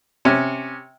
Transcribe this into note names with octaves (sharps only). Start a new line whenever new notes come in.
C3 C#4